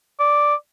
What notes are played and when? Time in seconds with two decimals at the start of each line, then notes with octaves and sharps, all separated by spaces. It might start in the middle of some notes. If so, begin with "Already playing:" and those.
0.20 D5